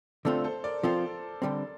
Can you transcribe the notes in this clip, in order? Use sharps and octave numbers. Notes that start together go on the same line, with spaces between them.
D3 A3 C4 F4 A4 C5
A4 C5
A#4 D5
F3 C4 F4 A4 C5
D3 G3 C4